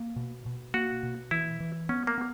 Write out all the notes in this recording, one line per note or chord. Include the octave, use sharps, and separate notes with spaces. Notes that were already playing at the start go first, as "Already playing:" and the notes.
Already playing: A#3
B2
B2
A#3 F#4
B2
E3 E4
E3
B3 C#4
A#3
B3